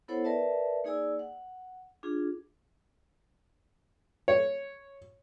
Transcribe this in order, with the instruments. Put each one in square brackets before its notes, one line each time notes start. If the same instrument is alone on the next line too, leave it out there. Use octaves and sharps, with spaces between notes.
[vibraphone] B3 E4 A4 C5 C#5 F#5
A#4 B4 D5 E5 A5
A#3 D#4 G#4 D5 G#5 E6
F#5
D4 F4 G#4
[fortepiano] C#5